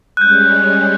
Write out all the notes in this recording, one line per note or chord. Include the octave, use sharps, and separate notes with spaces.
G3 G#3 C#4 F#6 G6